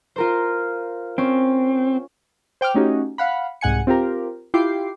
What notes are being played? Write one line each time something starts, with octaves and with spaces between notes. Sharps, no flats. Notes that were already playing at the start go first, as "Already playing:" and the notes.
F4 A#4 C5
C4 C#4
C5 G5 D6 F6
A3 C#4 D#4 F#4 G4
F5 F#5 B5
C2 G#2 F#5 G#5 C#7
C4 F4 G4 A#4
E4 F4 G4 G5 D6 C7